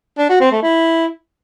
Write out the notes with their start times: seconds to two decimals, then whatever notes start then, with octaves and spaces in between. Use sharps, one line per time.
0.18 D4
0.29 F#4
0.40 C4
0.52 A3
0.63 E4